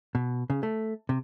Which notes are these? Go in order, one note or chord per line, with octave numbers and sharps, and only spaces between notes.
B2
C#3
A3
C3